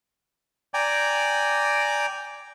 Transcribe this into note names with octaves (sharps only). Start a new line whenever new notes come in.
D5 G5 G#5 A#5